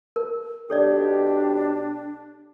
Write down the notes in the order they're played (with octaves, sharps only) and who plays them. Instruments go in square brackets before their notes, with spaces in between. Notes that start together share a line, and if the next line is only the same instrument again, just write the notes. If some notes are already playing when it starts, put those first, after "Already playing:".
[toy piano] A#4
[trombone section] B1 G4 [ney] D4 [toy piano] A4 C#5 D5